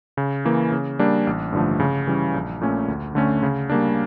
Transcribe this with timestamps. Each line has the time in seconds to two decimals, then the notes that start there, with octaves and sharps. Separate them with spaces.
0.17 C#3
0.45 E3 A#3
0.72 C#3
0.99 G3 A#3 D4
1.27 A1
1.53 G2 D3 F3 A3
1.80 C#3
2.07 E3 G3 C#4
2.34 A#1
2.61 A#2 A3 C#4
2.88 D2
3.15 D3 A3 C#4
3.43 C#3
3.70 G3 A#3 D4